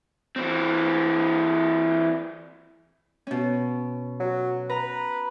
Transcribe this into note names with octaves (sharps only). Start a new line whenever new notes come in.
E3 C4
B2 C#4
F#3
B4 A#5